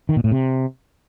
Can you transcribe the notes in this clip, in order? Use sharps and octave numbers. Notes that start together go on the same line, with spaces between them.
D#3
A#2
A2
C3